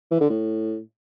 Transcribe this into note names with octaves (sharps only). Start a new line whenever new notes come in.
E3
D3
A2